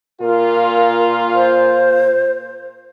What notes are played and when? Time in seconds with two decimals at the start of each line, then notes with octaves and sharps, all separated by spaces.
0.20 A#2 F4 A#4
1.34 C5